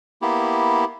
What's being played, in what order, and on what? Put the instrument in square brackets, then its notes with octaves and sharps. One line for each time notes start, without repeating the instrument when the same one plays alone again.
[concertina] A#3 B3 E4 G4